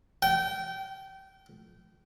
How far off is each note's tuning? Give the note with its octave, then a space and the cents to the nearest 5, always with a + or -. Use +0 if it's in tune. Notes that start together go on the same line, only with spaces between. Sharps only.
G5 -25